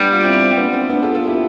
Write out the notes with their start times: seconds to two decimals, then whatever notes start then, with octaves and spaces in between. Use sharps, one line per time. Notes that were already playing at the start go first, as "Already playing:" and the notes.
Already playing: G3 B3 D4
0.12 F4
0.23 C4 E4
0.40 C4
0.57 B3 D4
0.73 C4
0.90 B3 D4
1.02 F4 A4
1.14 F4 A4
1.27 E4 G4